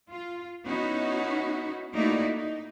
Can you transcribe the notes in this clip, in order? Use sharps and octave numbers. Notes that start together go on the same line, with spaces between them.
F4
B3 C#4 D#4 E4 F#4
A3 A#3 D#4 E4 F#4 D5
D#4